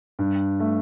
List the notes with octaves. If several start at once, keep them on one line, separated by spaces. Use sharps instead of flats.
G2
A3